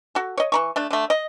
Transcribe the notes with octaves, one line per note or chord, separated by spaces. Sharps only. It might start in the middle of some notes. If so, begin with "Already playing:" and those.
F#4 A4
C#5 D#5
E3 A#5 C#6
A3 D4
D3 A3
D#5